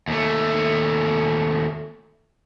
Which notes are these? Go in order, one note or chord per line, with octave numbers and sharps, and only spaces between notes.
D#2 A3